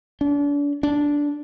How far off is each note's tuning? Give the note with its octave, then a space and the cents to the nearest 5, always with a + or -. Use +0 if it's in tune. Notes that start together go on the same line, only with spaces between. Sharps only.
D4 -35
D4 -10